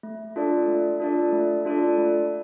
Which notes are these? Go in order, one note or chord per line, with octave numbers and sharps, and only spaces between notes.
A3
D4 F4 A4 D5
A3
D4 F4 A4 D5
A3
D4 F4 A4 D5
A3